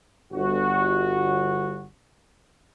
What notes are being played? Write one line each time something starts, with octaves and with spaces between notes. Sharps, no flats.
G1 F#4